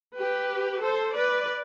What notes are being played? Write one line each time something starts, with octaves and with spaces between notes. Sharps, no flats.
G4 B4
A4 C5
B4 D5